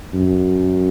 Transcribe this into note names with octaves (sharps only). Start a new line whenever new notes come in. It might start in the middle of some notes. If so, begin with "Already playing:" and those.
F#2